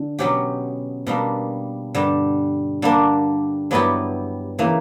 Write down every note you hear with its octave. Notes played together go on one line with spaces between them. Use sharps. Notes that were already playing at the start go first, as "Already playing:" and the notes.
Already playing: D3
B2 F#3 C#4 G4
B2 G3 A#3 D4
G2 D3 G3
D3 G3 A#3 D4
G2 F#3 B3 E4 G4
C#3 E3 A#3